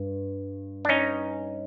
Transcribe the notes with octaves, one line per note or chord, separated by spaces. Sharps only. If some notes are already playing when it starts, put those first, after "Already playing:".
Already playing: G2
D4
C#4 D#4